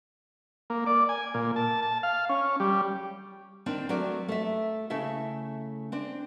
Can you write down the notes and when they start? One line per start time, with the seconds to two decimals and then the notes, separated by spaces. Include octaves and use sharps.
0.70 A#3
0.87 D5
1.09 G#5
1.34 A#2
1.56 A5
1.82 A5
2.03 F5
2.29 C#4
2.60 G3
3.66 D#3 C4 D4
3.89 F#3 A3 D5
4.28 A3 E5
4.90 C#3 A3 E4 E5
5.92 C4 D4